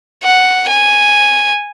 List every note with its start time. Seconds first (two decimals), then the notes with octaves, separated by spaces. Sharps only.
0.23 F#5
0.69 G#5